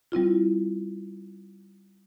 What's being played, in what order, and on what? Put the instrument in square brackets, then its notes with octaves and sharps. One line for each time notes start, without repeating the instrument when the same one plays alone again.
[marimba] G3 C4 E4 F4